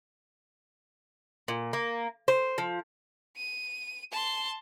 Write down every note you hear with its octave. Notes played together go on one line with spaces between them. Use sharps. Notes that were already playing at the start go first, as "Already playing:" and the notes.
A#2
A#3
C5
F3
D#7
A5 C6